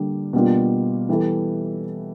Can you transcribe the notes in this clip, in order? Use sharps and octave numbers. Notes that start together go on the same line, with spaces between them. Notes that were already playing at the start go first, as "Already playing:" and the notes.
Already playing: D3 G3 A#3 D4
B2 G3 A#3 D4 F4
E3 G3 B3 E4 A4